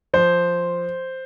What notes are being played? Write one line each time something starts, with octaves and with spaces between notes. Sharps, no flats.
F3 C5